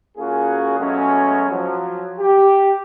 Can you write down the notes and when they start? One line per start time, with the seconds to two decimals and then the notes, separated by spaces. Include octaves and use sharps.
0.18 C#3 A#3 C#4 F4 F#4 G#4
0.79 B2 F#3 G#3 A3 C#4
1.50 F3 F#3
2.19 G4